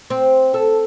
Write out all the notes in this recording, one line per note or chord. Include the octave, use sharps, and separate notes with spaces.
C4
A4